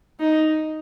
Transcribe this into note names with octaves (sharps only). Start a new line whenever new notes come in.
D#4